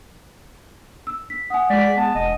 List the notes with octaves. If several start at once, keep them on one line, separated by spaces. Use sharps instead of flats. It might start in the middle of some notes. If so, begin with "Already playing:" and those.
E6
B6
F#5 G#5 D#6
G#3 D5 B6
B3 A5
E1 D#5